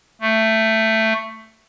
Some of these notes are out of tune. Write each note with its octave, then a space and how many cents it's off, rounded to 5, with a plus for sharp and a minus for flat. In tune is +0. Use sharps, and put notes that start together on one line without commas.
A3 +10